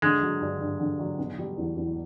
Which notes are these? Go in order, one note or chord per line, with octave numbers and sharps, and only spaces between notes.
D3 G#3
F#3
G2
G2
D3
F#3
B2
G3
E2
E2